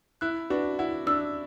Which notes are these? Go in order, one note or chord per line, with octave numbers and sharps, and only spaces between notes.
E4 F#6
D4 F#4 B4
E4 F#5
D4 E6